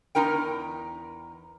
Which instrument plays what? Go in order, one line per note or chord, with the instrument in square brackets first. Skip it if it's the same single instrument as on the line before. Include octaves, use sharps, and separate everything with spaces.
[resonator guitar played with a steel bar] E2 D#4 A#4 G5